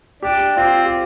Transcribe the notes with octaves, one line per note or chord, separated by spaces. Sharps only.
D4 G4
C4 F4
G4